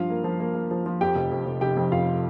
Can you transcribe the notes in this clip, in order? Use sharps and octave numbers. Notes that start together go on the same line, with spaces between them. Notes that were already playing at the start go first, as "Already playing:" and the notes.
Already playing: G2 F3 F4 F5
A#3
F3
A#3
A#3
F3
F3
F2 G4 G5
F1
F2
F1
F1 G4 G5
F2
F1 F4 F5